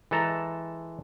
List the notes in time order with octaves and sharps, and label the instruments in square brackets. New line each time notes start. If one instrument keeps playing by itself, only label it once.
[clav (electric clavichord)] E3 G#3 A4 A5 A#5